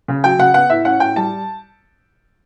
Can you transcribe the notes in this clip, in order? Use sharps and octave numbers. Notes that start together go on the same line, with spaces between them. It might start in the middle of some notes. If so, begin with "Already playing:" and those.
C#3
F#3 G5
C#3 F#5
B3 F#5
A2 E5
C#4 F#5
A2 G5
G3 A5